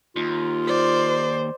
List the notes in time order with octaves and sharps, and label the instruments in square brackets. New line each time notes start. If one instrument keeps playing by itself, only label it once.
[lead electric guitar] D#2 [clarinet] F4
[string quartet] C5 [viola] D5